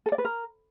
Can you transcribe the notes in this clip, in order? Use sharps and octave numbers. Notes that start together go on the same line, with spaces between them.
A4
D5
B4
A#4